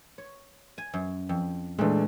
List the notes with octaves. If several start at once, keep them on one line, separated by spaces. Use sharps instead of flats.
C#5
G#5
F#2
F2
A#2 E3 G#3 A3 D4